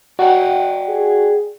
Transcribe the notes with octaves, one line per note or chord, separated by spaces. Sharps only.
F#4 D5 F#5 G5
G#4